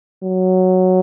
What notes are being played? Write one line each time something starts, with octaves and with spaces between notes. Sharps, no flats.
F#3